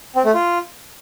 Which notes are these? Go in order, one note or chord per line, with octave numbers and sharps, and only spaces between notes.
C4
A3
F4